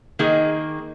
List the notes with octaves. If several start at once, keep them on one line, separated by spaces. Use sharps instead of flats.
D#3 A#3 D#4 G#4